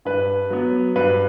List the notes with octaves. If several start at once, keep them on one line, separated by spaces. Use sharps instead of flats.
G2 B4
F#3 B3
G2 B4